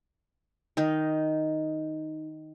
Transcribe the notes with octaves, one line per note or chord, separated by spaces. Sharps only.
D#3 D#4